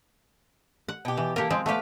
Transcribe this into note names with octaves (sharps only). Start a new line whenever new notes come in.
F#5
B2 G4
E3
A#3 G4 A4 A#4
F3 G#3 C4
A3 B3 G4 B4 F5